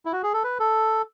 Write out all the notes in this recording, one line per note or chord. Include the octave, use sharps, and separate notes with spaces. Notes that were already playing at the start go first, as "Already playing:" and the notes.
E4
F#4
G#4
A4
B4
A4